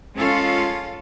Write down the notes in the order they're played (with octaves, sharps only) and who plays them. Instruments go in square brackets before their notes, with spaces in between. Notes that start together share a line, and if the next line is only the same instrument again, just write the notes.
[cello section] G#3 C#4 F4 A4 F5